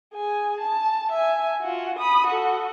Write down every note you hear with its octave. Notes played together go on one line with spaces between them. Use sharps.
G#4 G#5
A5
E5 G#5
F4 F#4
B5 D#6
F#4 A4